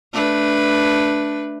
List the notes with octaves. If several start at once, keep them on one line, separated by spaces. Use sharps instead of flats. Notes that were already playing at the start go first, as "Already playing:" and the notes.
A3 D4 B4